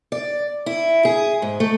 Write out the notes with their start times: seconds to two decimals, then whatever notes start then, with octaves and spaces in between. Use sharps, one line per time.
0.12 D5
0.66 E4
1.05 G#4
1.42 G#2
1.60 A3